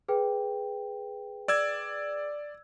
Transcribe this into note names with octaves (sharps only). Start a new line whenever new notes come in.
G#4 B4 G5
D5 E6 G#6